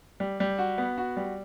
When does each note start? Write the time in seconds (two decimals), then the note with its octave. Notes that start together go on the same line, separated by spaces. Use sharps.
0.20 G3
0.40 G3
0.58 F#4
0.78 B3
0.98 F#4
1.17 G3